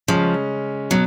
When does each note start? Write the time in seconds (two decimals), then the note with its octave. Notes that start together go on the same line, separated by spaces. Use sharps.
0.08 C#3 F3 G#3 C#4
0.91 B2 F#3